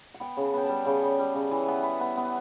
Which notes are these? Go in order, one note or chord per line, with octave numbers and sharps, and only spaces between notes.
F#5
B3 G5
C#3
A5
B3 G5
A5
G3
C#3 G5
G3
G3
C#3
E3
B3
B3
B3
B3